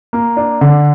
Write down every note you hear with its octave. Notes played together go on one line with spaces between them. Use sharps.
A#3
D4
D3